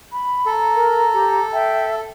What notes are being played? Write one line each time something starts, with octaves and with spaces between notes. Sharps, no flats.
B5
A4 A#5
A#4
G4
E5 G5